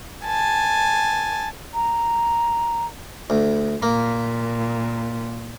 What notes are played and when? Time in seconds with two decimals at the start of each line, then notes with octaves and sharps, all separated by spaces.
0.26 G#5 A5
1.74 A#5
3.30 D2
3.82 A#2 A#3